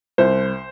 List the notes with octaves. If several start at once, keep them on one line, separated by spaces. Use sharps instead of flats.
C2 C5